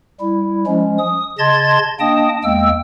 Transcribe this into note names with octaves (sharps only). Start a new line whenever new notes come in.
G3 E4
F3 G#3 C#4
D#6
C#3 D#5 A5 C6 G#6 A6
A#3 D4 D#5 G5 A5 D#6
E2 G#3 A#3 G5 E6